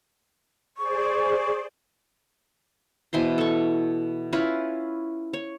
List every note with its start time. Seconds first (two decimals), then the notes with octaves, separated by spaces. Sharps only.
0.77 G#4 C5 D5 C#6
3.13 B2 E3 C5 C6
3.38 A4 C#6
4.33 C#4 E4 F4 B4
5.33 C#5